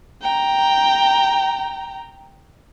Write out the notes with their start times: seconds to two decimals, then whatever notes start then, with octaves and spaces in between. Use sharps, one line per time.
0.22 G5 A#5